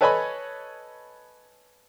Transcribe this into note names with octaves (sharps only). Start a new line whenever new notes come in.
A4 B4 C#5 D#5 G#5 B5